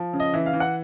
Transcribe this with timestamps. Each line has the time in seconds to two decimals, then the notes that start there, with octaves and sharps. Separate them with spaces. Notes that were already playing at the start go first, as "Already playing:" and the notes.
Already playing: F3
0.13 C#3
0.20 D#5
0.34 E3 E5
0.46 F5
0.53 E3
0.60 F#5